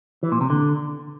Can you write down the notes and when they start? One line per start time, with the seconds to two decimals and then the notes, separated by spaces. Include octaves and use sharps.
0.23 E3
0.32 A#2
0.41 C3
0.50 D3